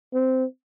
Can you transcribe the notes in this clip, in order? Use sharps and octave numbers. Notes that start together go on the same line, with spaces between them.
C4